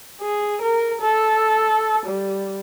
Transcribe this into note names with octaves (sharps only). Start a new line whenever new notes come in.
G#4
A#4
A4
G3